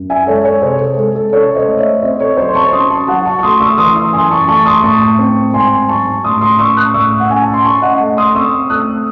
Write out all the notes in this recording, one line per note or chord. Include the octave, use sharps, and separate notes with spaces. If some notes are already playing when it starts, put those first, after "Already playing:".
Already playing: F#2
E5 G#5
G#3 A4 C#5
A4 C#5
C3 G#4 C5
A4
G#3 A4
A4
C#4 A4 C#5
C5 D#5
A3
C#5 E5
C4 C5 D#5
A4 C#5
F#3 C5 D#5
C6
A5 C#6
C#4 C6 D#6
A5 C#6
F#3 F#5 A5
A5 C#6
C#6
A3 C6 D#6
C#6 E6
E3 C6 D#6
C6 D#6
F#2 G#5 C6
A5 C#6
A3 A5 C#6
C6 D#6
A2 A5 C#6
C4
G#2 G#5 C6
F#3 A5 C#6
A2 C6 D#6
C6 D#6
C#4 C#6 E6
D#6 F#6
A2 C#6 E6
F#5
C#4 G#5
A5
C6
C#4 A5 C#6
D#5 F#5
A3
C6 D#6
C4 C#6 E6
A3 D#6 F#6